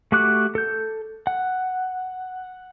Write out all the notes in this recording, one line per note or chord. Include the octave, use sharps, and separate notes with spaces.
A3 F#4 G4 D6 F#6
A4 G6
F#5